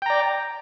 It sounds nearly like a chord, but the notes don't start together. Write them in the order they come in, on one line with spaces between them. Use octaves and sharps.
G5 A#5 D5